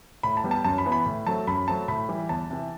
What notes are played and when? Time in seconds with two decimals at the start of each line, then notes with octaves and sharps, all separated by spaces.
0.23 A2 B5
0.37 A5
0.44 G3 B3
0.51 A5
0.64 F#2 A5
0.78 B5
0.85 E3 B3
0.92 B5
1.06 A2
1.26 F#3 A3 C4 A5
1.47 F#2 B5
1.68 F#3 A3 C4 A5
1.88 A2 B5
2.09 E3 G3
2.29 E2 A5
2.50 C3 E3